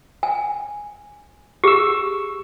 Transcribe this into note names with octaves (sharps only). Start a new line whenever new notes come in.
G#5
G4 G#4 C#6 E6